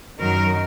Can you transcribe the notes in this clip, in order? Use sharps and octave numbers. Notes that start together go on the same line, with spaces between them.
F#2 D#3 F#3 A#4